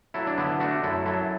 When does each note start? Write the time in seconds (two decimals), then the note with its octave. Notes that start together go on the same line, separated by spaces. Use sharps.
0.14 F#3 E4 A4
0.27 D4
0.38 D3 B3 E4
0.60 A3 D4 F#4
0.83 F#2 E4 A4
1.06 F#3 E4 A4